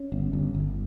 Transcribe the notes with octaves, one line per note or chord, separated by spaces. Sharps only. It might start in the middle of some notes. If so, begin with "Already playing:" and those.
Already playing: C#4
G1
G1
G1